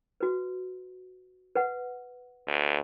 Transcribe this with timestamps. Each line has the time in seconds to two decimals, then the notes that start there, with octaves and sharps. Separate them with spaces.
0.20 F#4 B4
1.55 B4 F#5
2.48 D2